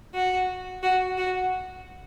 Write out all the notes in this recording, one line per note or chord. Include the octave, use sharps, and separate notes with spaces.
F#4
F#4
F#4